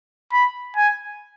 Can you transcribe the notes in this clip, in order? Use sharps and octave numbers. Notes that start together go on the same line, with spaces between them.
B5
G#5